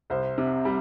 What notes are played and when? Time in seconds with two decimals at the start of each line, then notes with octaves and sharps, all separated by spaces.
0.10 C2 C5
0.38 C3
0.65 G3